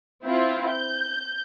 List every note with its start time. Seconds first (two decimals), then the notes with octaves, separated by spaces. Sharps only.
0.24 C4 E4 F4
0.71 G6